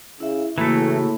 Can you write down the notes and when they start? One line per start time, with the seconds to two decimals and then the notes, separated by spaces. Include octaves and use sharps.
0.20 C#3 E4 E5
0.58 A2 C#3 E3 A3 A#3 F#4 B5 E6